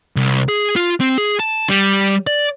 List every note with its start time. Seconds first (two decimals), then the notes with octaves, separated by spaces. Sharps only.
0.16 C2
0.49 G#4
0.76 F4
1.00 C4
1.18 G#4
1.40 A5
1.69 G3
2.27 D5